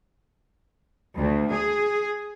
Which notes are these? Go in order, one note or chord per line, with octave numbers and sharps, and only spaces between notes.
D2
G#4